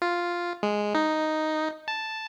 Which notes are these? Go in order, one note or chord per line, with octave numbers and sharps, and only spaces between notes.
F4
G#3
D#4
A5